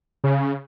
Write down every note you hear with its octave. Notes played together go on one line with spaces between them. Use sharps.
C#3